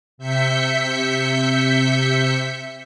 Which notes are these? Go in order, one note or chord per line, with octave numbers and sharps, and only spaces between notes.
C3 E5 G6 B6 C#7